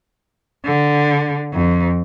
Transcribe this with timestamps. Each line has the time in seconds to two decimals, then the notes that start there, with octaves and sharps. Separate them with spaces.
0.65 D3
1.53 F2